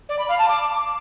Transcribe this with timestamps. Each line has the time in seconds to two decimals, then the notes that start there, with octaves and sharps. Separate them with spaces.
0.09 D5
0.18 B5
0.28 F5
0.38 A5
0.48 D6